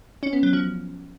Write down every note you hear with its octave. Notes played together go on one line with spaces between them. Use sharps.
C#4
B3
F#3
F3